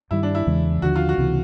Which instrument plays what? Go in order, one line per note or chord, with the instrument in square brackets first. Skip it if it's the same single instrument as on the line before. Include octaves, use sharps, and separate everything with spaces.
[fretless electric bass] G2 D#3 G3 [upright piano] E4
[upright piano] D4
E4
[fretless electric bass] E2 C#3 E3 G#3
[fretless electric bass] D#2 D3 F3 [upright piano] F#4
[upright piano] F4
F#4
[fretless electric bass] C#2 C3 E3